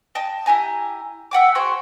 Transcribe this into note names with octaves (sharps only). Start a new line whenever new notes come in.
D#5 G5 A5
E4 G4 G#5 A#5
E5 F#5 G5 D6
F#4 G#4 C5 G5